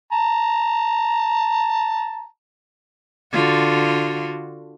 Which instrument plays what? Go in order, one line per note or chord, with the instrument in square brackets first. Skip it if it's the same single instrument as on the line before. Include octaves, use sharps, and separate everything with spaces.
[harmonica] A5 A#5
[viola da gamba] D3 F4 F#4